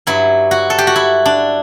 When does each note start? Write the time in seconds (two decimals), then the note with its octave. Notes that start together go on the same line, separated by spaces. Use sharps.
0.07 G2 F#3 E4
0.51 F#4
0.70 A4
0.78 G4
0.87 F#4
0.96 E4
1.26 D4